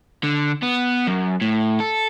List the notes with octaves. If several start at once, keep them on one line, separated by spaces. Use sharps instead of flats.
D3
B3
F#2
A2
A4